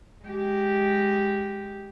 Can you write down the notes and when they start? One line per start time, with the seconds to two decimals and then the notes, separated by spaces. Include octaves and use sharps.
0.24 G#3 G4